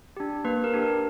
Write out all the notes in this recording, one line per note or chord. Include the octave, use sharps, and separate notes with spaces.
D4 G4
A#3 B4
A#4
D4 G4
A#4